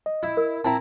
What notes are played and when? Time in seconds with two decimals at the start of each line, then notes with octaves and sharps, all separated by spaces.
0.06 D#5
0.23 E4
0.37 A#4
0.64 C4 E4 A5 A#5